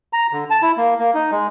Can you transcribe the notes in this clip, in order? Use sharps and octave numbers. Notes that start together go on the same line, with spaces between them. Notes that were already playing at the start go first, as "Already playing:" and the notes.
A#5
D3
A5
E4
A#3
A#3
D#4
G#3